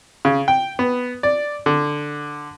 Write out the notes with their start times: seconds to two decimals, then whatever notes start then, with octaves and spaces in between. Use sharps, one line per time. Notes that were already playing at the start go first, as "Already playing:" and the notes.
0.25 C#3
0.48 G5
0.79 B3
1.23 D5
1.66 D3